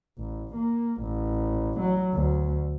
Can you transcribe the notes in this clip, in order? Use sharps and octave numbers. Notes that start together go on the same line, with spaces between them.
A1
A#3
A1
F#3
D2